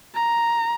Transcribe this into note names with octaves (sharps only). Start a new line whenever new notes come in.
A#5